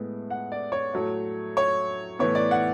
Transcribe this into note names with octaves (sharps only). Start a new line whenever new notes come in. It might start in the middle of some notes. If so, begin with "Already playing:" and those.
Already playing: A2 G#3 B3
F#5
D5
C#5
A2 F#3 A3
C#5
A2 E3 B3 C#5
D5
F#5